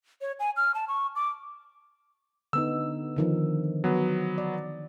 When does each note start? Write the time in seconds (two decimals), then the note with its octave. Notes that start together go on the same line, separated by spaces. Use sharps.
0.21 C#5
0.39 G#5
0.57 F6
0.74 A5
0.88 C#6
1.15 D6
2.53 D3 B3 D#4 E6
3.16 D3 D#3 F3
3.84 F#3 B3
4.38 D5